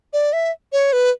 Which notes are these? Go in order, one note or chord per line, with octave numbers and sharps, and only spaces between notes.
D5
E5
C#5
B4